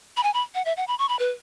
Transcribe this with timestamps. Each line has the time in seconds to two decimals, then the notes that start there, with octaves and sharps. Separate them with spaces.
0.17 B5
0.23 G#5
0.34 B5
0.55 F#5
0.65 E5
0.77 F#5
0.88 B5
0.99 C#6
1.09 B5
1.19 B4